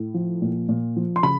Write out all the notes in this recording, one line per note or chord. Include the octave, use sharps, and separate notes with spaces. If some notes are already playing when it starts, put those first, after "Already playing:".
Already playing: A2
F3
A#2
A#2
F3
C6
C#3 B5